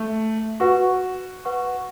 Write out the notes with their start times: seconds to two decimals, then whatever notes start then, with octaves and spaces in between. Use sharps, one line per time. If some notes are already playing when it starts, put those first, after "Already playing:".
Already playing: A3
0.60 F#4 B4 F#5 C#6
1.45 B4 F#5 C#6